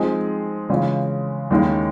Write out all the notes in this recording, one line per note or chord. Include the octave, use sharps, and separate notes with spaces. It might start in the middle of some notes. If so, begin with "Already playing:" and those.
Already playing: F3 G#3 C4 D#4 G#4
C#3 E3 G#3 C#4 F4
D#2 D#3 G#3 C#4 E4